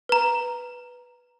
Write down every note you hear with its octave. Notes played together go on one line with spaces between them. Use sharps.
B4 A#5